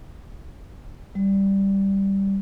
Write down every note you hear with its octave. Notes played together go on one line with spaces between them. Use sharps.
G3